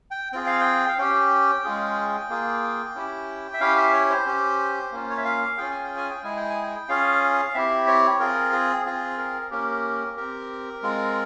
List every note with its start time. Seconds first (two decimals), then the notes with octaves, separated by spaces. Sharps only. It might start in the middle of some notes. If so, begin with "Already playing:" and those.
0.11 G5
0.33 C4 F4 G#4 G5
0.46 F5
0.60 G5
0.88 F5
0.98 C#4 G4 G5
1.64 G#3 C#4 F4 G#4
2.29 A#3 F4 G#4
2.95 C#4 E4 G4
3.54 E5
3.60 C#4 E4 G4 F5
3.77 E5
3.93 C#5
4.10 C5
4.26 C#4 G4
4.92 A#3 C#4 F4
5.10 C#5
5.17 E5
5.25 F5
5.57 C#4 F4 G#4 G5
5.71 G#5
5.84 G5
5.97 G#5
6.10 G5
6.23 G#3 E4 G#4 G#5
6.37 G5
6.50 G#5
6.63 G5
6.89 C#4 F4 G#4 F5
7.54 C4 E4 G4 E5
7.87 C#5
8.20 C4 F4 G#4 A#4
8.53 G#4
8.86 C4 F4 G#4
9.18 A#4
9.51 A#3 C#4 G4 A#4
10.17 C4 G4 A#4
10.83 G#3 C4 F4